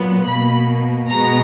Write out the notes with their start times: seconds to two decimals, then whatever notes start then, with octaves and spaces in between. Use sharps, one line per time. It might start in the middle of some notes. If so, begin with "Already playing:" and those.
Already playing: A#2 F#3 B3
0.26 B2 A#3 B5
1.10 B2 G#3 B3 A#5